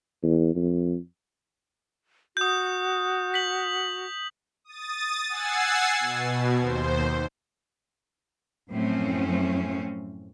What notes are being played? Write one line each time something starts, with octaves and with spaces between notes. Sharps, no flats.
E2
F2
F#4 D#6 G6
B6 F#7
D#6 A6
F#5 G#5 E6 G#6 A6 C7
B2
D#2 C5
F#2 A2 F3 C4 C#4